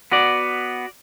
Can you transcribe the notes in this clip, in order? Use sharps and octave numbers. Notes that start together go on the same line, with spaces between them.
B3 F#4 D5